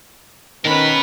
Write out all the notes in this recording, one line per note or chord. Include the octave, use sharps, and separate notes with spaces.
B2 D#3 C#4 B4 B5